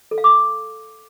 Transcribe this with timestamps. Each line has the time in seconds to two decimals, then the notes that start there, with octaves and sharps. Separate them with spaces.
0.11 A4
0.18 F5
0.24 D6